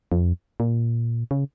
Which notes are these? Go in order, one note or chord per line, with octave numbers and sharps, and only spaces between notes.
F2
A#2
C#3